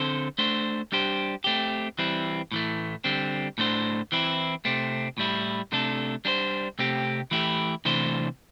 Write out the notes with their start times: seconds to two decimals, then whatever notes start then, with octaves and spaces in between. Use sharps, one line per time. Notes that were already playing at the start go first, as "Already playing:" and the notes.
Already playing: D3 C4 A4 C5
0.38 A3 D4 C5
0.92 G3 D4 G4 C5
1.44 A3 C4 G4
1.98 E3 G3 C4 E4
2.52 A2 E3 A3
3.04 D3 G3 C4
3.58 A2 A3 D4 C5
4.12 E3 C4 E4
4.65 C3 A3 C4
5.18 A2 G3 E4
5.72 C3 A3 D4 A4
6.25 G3 D4 A4 C5
6.79 C3 A3 C4 G4
7.31 E3 A3 E4 G4
7.85 C3 E3 A3 D4 C5